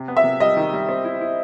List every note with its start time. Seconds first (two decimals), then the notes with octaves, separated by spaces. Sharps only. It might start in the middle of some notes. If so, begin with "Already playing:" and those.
Already playing: C3
0.08 B3
0.17 E5
0.24 C3
0.40 G3 D#5
0.57 D#3
0.73 G3
0.89 C4
1.05 E4
1.21 E4